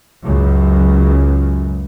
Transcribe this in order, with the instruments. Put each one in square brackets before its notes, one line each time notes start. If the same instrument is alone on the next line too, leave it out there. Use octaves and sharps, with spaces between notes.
[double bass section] C#2 F#2